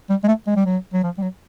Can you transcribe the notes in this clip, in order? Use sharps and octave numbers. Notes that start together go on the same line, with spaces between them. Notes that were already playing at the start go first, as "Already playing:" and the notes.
G3
G#3
A3
G#3
G3
F#3
F#3
F3
G3
F#3